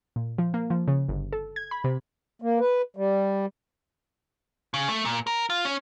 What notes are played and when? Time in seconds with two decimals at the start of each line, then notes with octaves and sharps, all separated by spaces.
0.16 A#2
0.38 F3
0.54 A#3
0.70 F3
0.88 C#3
1.09 G1
1.33 A4
1.56 G#6
1.71 B5
1.84 C3
2.42 A#3
2.60 B4
2.97 G3
4.74 C#3
4.88 A3
5.05 A#2
5.27 A#4
5.50 F4
5.65 C#4